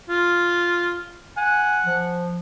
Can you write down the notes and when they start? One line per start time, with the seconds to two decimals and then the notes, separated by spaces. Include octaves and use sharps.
0.09 F4
1.37 F#5 G#5
1.85 F3